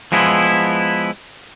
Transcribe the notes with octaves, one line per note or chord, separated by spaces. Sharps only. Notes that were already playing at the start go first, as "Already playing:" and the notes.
F3 G#3 B3 E4